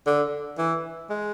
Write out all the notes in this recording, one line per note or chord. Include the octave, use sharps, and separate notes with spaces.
D3
E3
G#3